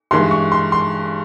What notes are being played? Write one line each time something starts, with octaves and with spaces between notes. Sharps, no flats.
G2 E3 G#3 C6
C#6
C6
C6